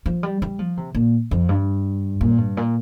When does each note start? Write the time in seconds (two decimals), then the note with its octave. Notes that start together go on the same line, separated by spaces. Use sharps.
0.06 F3
0.23 G3
0.42 G3
0.59 F3
0.77 C3
0.95 A#2
1.31 F2
1.49 G2
2.21 A#2
2.38 G2
2.57 A#2